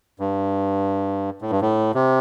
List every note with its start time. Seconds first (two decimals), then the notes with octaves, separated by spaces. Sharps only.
0.20 G2
1.42 A2
1.51 G2
1.61 A2
1.95 C3